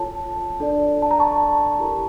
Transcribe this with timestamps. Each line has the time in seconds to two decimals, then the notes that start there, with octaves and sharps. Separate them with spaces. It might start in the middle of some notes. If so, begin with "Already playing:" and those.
Already playing: F4 A4 C#5 A5
0.60 D4 A4 D5
1.02 A5
1.11 A#5
1.20 A5 C#6
1.79 E4 G4 A#4